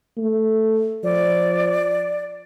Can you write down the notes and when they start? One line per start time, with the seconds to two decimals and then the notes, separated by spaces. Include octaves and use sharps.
0.17 A3
1.04 F3 D5